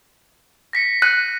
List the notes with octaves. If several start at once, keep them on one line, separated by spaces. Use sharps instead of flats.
A#6 B6 C#7
F#6 C#7 D#7